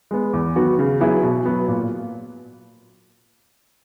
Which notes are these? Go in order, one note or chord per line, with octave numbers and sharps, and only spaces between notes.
G#3 B3
E2
D#3 F#3 B3 F#4
C#3
F#3 B3 E4 G#4
B2
F#3 B3
A#2